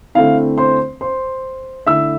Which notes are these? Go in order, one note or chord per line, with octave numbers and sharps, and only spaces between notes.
D3 A3 C4 E4 F5
C5 C6
C5 C6
D3 A3 E4 E5 E6